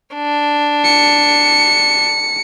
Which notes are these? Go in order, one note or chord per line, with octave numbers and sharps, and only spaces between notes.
D4
C#7